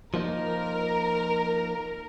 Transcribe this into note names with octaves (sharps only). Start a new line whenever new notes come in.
F3 A#3 D#4 A#4